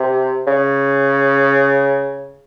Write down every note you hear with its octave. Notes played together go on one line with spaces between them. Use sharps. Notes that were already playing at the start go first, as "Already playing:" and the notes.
Already playing: C3
C#3